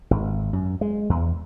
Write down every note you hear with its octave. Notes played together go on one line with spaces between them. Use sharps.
G#1
F#2
G#3
E2